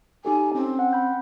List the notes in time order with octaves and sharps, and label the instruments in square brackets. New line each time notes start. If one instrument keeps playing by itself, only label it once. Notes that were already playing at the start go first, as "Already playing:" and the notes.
[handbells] D#4 G4 A4 [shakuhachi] G#5
[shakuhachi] C4 [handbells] C#4
[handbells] F#5
B5 G6